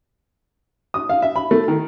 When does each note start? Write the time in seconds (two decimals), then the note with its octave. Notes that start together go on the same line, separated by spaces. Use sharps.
0.94 D#6
1.09 F5
1.22 E5
1.36 B5
1.51 A3
1.68 D#3